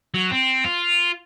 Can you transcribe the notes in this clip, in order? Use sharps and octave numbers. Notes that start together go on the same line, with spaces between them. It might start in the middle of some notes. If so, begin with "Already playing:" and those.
F#3
C4
F4